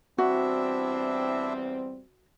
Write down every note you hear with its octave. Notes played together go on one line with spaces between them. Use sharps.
E2 G3 C4 D4 E4 F#4 E5